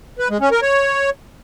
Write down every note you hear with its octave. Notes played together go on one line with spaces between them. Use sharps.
B4
G#3
C#4
A#4
C#5